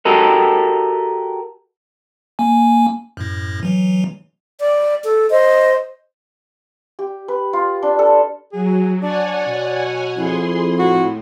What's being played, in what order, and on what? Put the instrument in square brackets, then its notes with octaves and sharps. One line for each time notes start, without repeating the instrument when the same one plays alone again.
[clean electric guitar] F#4 G4 A4 A#4 D#5
[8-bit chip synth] A#3 G#5
F#2 A2
E3 F#3
[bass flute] D5
A4
[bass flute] C5 [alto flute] D#5
[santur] G4
B4
F4
D4
A4
[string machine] F#3 [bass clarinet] G#4
[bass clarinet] D4 [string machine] C#5 F#5 G#5 [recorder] D5
[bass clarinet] B2
[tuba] F2 [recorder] E4 [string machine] G#4 C6
[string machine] A2 [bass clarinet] F#4